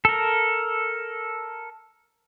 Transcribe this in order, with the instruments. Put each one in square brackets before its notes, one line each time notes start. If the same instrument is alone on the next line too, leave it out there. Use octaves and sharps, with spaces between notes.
[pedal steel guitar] A4 A#4